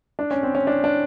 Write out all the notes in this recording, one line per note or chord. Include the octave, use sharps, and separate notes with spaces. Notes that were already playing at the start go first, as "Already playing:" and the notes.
D4
C#4
C4
C#4
D4
D4